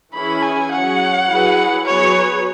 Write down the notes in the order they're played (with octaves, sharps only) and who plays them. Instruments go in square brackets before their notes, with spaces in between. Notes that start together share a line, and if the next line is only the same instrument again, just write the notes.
[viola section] E3 C#4 E4 G#4 C#5 [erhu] B5
[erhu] G#5
[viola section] F#3 C#4 G#4 C#5 [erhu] F#5
[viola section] F#3 E4 G#4 B4
[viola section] F#3 B3 G#4 B4 [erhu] C#5